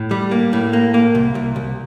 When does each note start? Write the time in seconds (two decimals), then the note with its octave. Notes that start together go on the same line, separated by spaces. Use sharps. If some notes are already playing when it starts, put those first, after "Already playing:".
Already playing: A2
0.11 G3
0.31 A#3
0.53 A2
0.73 A#3
0.94 A#3
1.15 C2
1.35 C2
1.56 C2